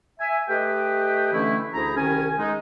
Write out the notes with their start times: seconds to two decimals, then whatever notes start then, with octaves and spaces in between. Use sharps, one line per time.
0.20 E5 G#5
0.49 A3 G4 B4 D#5 G5
1.32 D3 E3 A3 C#4 E4
1.73 D2 E4 G#4 C5 A#5
1.97 C2 D#3 C#4 G#5
2.38 G#3 D#4